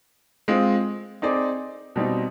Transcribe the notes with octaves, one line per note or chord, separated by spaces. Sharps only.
G#3 C4 F4
C4 D#4 G#4 D5
B2 G3 C4 D#4